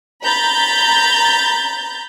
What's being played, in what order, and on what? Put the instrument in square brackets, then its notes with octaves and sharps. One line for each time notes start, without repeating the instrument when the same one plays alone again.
[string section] A#5 B5 G6 A6